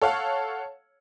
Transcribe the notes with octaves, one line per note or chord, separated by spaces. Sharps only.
A4 C#5 F5 F#5